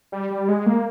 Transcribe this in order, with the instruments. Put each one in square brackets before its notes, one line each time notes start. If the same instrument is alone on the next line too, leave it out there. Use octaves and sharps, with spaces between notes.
[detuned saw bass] G3
G3
G#3
A#3